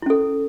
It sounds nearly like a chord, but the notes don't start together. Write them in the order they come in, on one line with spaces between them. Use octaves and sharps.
E4 C#4 A4